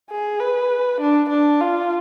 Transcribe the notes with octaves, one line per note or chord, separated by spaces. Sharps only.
G#4
B4
D4
D4
F4